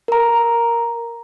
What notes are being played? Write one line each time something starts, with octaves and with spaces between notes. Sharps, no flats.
A#4 A#5